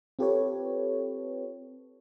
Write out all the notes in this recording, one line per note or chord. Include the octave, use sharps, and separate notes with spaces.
C4 F4 G4 A4 B4 C#5